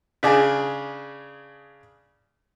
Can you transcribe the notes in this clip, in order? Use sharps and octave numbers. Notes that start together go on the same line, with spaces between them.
C#3 D4 G#4